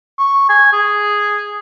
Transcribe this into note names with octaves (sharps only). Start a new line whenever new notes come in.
C#6
G#5
G#4